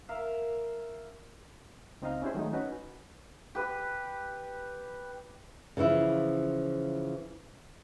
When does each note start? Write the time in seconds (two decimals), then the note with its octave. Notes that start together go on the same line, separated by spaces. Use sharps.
0.09 A#4 E5 F5
2.02 C#2 C4 D#4 D#5 F5 A#5
2.22 C#4 D4 E4 G4 G#4 C5
2.35 D#3 F#3 G#3 A3 D#4
2.53 C#4 D#4 F#4 B4
3.55 G4 B4
5.77 C#3 E3 F3 E4 F4